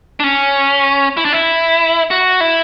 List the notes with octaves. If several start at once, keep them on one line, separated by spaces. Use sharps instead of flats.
D4
C#4
E4
D4
E4
F#4
E4